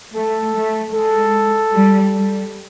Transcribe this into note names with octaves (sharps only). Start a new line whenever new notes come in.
A3 A4
A3
G#3 A4
G3
G3